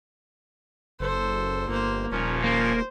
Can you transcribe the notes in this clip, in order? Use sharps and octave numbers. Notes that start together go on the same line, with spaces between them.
F#1 A4 C5
G1 A#3 C5
D#1 A#2 F3 C#4 A#4
A#3 C5